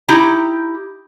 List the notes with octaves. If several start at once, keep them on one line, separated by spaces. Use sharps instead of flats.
D#4 E4 G4 A#5